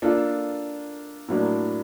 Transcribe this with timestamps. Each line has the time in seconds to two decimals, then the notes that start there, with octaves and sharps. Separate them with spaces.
0.02 A#3 D4 F4 A4
1.28 A2 F#3 A#3 D4